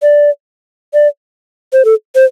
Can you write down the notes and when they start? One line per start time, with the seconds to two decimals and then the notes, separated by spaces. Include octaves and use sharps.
0.02 D5
0.94 D5
1.73 C5
1.85 A4
2.15 C5